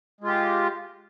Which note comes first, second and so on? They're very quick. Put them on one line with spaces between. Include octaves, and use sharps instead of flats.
G#3 F4 G4